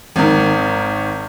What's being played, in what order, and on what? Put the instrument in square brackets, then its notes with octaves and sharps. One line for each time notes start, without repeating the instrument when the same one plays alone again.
[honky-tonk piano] G#1 D#3